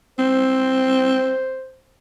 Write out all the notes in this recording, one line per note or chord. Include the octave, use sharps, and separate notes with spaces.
C4 C5